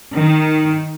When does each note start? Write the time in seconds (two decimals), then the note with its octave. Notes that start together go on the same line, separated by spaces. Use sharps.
0.14 D#3